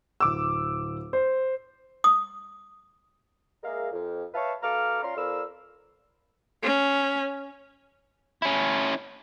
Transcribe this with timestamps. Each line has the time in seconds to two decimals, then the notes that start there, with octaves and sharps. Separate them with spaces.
0.20 D1 D6 E6
1.13 C5
2.04 D#6
3.63 G#3 A#3 G#4 A#4 E5 F5
3.92 F2
4.34 B4 C#5 E5 F5 A5
4.62 B2 A4 F5 A#5 D6 F6
5.03 C#4 F4 D5 A#5 C6
5.16 F2 A#4 D5 F5 B5 E6
6.63 C#4
8.42 C#4 E4